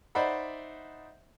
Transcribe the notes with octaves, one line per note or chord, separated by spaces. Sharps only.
D#4 C5 D5 E5 F#5 B5